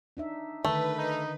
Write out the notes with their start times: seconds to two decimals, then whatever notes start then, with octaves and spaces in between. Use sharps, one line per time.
0.17 D4 D#4 E5
0.65 D3 D#3 A3 B4
0.98 D#4